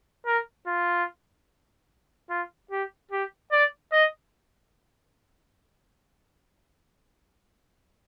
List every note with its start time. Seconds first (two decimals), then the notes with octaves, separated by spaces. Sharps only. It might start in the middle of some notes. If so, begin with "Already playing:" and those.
0.26 A#4
0.67 F4
2.30 F4
2.71 G4
3.11 G4
3.52 D5
3.92 D#5